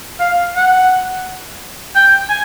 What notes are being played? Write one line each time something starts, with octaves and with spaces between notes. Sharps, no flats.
F5
F#5
G5
G#5